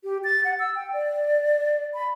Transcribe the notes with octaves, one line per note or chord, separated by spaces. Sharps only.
G4
A6
F#5
E6
G5
D5
B5